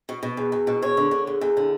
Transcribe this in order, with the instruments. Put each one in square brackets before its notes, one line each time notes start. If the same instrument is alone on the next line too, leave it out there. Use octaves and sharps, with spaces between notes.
[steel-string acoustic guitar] B2
B2
E2
E2
B2
E2 C#5
D3
D3
E2
E2
D3